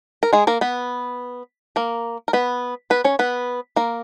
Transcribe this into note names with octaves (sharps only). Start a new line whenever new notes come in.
A#4
G#3 G#4
A#3 A#4
B3 B4
A#3 A#4
A#4
B3 B4
B3 B4
C#4 C#5
B3 B4
A#3 A#4